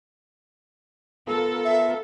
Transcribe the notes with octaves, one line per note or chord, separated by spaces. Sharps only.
B3 F4 A4 A#4
E5